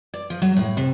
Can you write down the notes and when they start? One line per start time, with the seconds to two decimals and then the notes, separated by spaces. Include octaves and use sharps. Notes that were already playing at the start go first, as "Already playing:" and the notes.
0.14 D5
0.30 F3
0.42 F#3
0.56 A2
0.77 C3